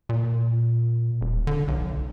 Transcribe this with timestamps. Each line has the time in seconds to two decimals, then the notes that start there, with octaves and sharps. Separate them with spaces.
0.09 A#2
1.21 D#1
1.47 D3
1.68 B1